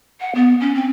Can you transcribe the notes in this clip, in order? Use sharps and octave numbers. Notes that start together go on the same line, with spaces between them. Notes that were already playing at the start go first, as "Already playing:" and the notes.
F#5
B3
C#4
C4